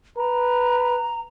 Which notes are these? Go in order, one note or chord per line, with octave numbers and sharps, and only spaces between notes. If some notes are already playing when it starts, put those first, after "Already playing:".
B4 A#5